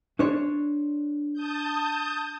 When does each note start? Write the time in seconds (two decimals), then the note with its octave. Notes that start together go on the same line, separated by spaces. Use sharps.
0.19 D4 C5 C#5
1.34 A5 D#6 G6